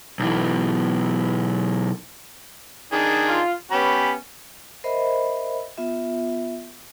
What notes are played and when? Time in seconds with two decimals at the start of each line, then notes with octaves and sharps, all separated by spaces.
0.20 B1 E3
2.92 D#3 D4 G#4
3.28 F4
3.71 B3 C#4 G4 B5
4.84 A#4 C5 D#5 E5 B5
5.77 B3 F4 E5